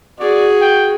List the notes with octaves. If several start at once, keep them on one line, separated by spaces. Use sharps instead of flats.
F#4 G#4 D5
G5